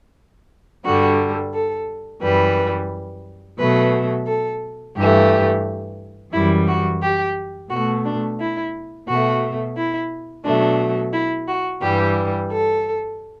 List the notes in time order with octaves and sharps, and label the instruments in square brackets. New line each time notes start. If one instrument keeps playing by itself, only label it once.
[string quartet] G2 D3 G3 F#4
A4
F#2 E3 G3 B4
B2 F#3 A3 B4
A4
G2 E3 A3 G4
F#2 E3 G3 E4
F#4
G4
B2 A3 F#4
D4
E4
B2 A3 F#4
E4
B2 F#3 A3 D4
E4
F#4
G2 E3 G3 G4
A4